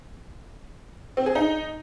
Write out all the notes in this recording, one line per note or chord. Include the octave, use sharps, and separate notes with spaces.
C4
G#4
D#4